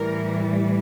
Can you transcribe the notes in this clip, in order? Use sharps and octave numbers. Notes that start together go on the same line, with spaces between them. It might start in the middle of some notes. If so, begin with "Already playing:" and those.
Already playing: A2 E3 G3 A#4